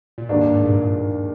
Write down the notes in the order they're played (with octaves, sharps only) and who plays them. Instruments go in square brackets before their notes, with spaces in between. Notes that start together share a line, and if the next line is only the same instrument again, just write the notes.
[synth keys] A#2
[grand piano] D#2 D#3 A#3 D4 [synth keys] G#2
[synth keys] G2
G#2
G2 A#2
G#2